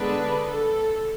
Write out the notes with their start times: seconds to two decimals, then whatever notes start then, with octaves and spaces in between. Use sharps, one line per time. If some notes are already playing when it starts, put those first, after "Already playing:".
Already playing: D3 G#3 B3 D4 B4
0.47 A4